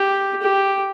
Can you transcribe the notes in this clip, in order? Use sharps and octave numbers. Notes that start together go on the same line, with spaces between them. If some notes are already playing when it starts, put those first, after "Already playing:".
Already playing: G4
G4